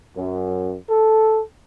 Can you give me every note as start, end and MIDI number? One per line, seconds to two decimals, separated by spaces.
0.16 0.78 42
0.90 1.42 69